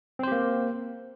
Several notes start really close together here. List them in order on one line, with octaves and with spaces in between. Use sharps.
C4 C5 G4 A#3